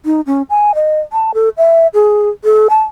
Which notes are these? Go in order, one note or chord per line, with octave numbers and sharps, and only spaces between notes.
D#4
C#4
G#5
D#5
A5
A4
E5
G#4
A4
A5